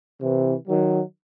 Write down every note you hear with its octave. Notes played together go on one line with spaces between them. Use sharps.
C3 E3
D#3 F#3